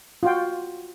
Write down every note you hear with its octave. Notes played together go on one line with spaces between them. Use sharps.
F4 F#4 G5